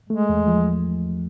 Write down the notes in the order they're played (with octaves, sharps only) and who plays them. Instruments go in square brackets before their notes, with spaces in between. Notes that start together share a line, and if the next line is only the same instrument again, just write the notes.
[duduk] G#3 [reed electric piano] A3
[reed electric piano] E2
F3